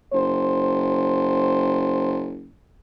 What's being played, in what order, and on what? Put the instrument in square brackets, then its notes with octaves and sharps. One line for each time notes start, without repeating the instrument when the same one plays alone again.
[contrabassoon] F#1 [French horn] C5